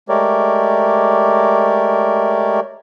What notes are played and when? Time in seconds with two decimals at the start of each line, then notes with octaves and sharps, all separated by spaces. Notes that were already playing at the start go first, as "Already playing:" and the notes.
0.09 G#3 A3 G4 A#4 C#5 D5